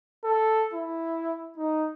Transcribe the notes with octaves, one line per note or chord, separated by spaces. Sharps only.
A4
E4
D#4